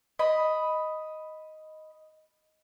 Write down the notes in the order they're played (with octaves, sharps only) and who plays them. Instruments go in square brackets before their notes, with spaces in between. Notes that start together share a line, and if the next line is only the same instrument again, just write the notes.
[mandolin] D#5 B5